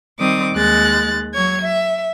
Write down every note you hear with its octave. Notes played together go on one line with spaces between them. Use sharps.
D#3 G3 C4 D6 D#6
D#2 G#3 F#6 A6
F#3 C#5 G#6
E5